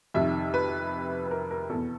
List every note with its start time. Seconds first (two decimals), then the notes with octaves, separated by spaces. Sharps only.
0.14 F2 C3 D#3 E5
0.54 B4
1.27 B4
1.31 A#4
1.51 A#4
1.70 E2 B2 A4